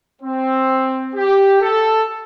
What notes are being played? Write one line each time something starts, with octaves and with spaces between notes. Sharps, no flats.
C4
G4
A4